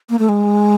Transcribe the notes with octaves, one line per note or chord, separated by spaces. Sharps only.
A#3
A3
G#3